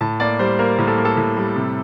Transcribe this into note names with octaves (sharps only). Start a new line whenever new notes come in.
A2 A5
A#3 D5
G3 C5
A#3 A#4
A2 A#4
A4
A#3
A4
A2
G3
C3